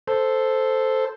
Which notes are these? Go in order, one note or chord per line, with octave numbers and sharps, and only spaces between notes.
A4 C5